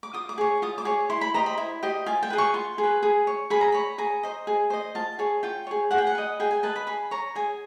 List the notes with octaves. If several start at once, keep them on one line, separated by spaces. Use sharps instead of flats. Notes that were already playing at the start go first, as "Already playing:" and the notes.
D6
F4 D#6
D6
G#4 C#5
F4 D#6
D6
G#4 C#5
E4 C6
B5
G4 C5 D#5 A#5
B5
E4
G4 C5 D#5
F4 G#5
G5
G#4 B4
C#6
F4 C6
G#4
B4
G#4
C#5
G#4 B5
A#5
C#5 B5
G#4 A#5
C5 D#5
G#4
C5 D#5
F4 A5
G#4 C#5
F4 G5
G#4 C#5
G#4 F#5
G5
F#5
B4 D#5
G#4 G5
G#5
B4 D#5 A5
B5
G#4 B5
C#5 A#5
G#4 G#5